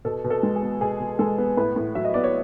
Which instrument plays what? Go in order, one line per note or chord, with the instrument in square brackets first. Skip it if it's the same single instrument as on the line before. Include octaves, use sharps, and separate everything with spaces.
[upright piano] B2 A4
B2
A4
G#3
G#4
B3
B2 G#4
B2
G#3 A4
B3
A2 B4
A2
F#3 E5
D#5
B3 D5
C#5